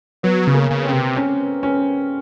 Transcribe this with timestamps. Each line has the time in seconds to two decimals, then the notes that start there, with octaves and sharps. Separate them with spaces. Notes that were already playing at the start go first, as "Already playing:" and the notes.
0.23 F#3 B3
0.47 C#3
0.54 A#3
0.71 C#3
0.85 C4
0.93 C3
1.16 C#4
1.63 C#4